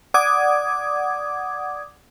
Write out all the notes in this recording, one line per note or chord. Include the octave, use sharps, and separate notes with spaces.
D5 F#5 D6 D#6 G#6